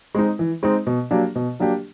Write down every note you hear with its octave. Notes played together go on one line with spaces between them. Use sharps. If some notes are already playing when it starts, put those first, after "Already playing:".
G#3 C4 D#4
E3
G#3 C4 D#4
B2
F#3 A#3 D4 G4
B2
F#3 A#3 D4 G4